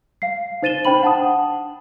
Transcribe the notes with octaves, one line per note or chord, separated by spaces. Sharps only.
F5 C7
D#4 C5 A6 D#7 E7 G7
D4 C5 G5 B5 F#7
F#5 A5 D#6